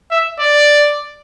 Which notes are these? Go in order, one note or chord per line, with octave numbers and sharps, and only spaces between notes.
E5
D5